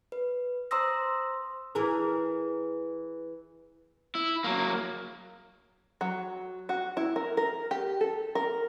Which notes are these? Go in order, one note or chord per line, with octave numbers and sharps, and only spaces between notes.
B4
C5 A#5 C6 D#6 E6 A#6
E3 G#4 A#4
E4
F#3 A#3
F#3
F#4
E4
A#4
A#4
G4
A4
A#4